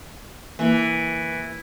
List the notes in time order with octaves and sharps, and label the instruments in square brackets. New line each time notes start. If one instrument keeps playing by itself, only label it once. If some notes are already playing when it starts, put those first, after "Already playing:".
[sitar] E3 [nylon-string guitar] A#3 E4